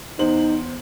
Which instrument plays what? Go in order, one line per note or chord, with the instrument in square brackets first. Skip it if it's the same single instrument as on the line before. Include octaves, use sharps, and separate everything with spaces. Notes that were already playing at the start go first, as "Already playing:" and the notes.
[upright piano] E2 C5 F#7 [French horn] D#4